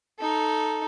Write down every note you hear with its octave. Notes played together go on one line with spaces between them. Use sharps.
D#4 A4